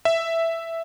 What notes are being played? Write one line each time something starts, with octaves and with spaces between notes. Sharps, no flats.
E5